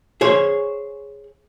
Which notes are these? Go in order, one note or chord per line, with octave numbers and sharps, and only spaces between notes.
G#4 C5 C#5